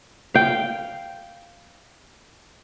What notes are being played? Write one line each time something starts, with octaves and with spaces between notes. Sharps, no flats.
F5 G5